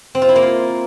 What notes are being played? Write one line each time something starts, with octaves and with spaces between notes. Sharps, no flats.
C4
F4
E4
A#3
F4